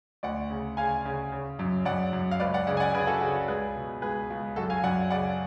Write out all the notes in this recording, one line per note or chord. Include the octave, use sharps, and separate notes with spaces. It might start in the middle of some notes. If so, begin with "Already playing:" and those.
D2 D5 F#5
C#3
C#3 F5 G#5
C#3
C#3
F#2
F#2 D5 F#5
F#2
F5
C#2 B4 D5
D5 F#5
C#3 D5 F#5
G#5
D5 F#5
C#3 G#4 B4
F#4 A4
C#3 F#4
C#2 G#4 B4
B2
C#2 G#4 B4
C#2
F#2 F#4 A4
F5 G#5
F#2 D5 F#5
C#3 D5 F#5